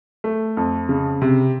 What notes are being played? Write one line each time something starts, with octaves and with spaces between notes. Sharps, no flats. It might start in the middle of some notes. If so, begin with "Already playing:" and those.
A3
F2
C#3
C3